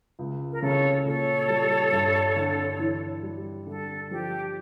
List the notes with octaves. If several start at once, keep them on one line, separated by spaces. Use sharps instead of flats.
C#2
A#4
C#3 A4 C#5
A#2 A4 C#5
G3
G2
D3
E3
G3
D3 A4
F3 G4